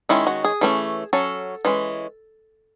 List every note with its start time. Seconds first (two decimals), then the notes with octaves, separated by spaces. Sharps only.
0.09 D#3 G#3 C#4 E4
0.27 F#4
0.44 G#4
0.61 E3 A3 C#4
1.13 F#3 C#4 A4
1.65 E3 G#3 C#4